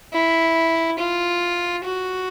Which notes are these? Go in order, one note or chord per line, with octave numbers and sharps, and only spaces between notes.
E4
F4
F#4